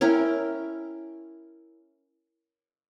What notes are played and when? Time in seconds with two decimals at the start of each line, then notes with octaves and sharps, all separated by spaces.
0.01 C#4 E4 A#4 G5